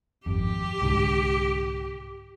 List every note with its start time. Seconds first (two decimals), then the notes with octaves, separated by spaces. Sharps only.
0.26 G#1 F2 G4
0.82 C2 G#2 D3